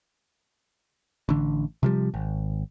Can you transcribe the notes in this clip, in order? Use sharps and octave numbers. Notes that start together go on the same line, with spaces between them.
A1 D3
C3 F3 G3
G#1